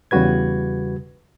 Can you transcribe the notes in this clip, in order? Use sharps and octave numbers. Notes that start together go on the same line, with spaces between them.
E2 C#3 G3 F#4 B4 G#6